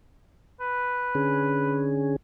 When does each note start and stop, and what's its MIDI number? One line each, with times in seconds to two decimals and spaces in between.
0.60 1.87 71
1.15 2.16 50
1.15 2.16 61
1.15 2.16 68